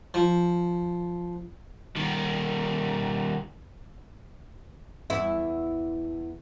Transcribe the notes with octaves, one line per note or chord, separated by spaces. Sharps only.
F3
D#3 G3
E2 E4